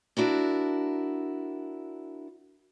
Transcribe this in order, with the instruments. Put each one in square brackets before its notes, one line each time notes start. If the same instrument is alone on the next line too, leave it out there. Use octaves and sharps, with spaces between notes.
[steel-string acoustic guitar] D4 E4 F#4 A#4